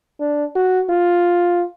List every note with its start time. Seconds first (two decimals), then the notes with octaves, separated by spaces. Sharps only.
0.20 D4
0.55 F#4
0.90 F4